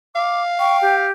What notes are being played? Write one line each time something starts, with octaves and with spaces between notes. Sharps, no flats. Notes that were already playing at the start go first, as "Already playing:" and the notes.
F5 D6
G5 C#6
G4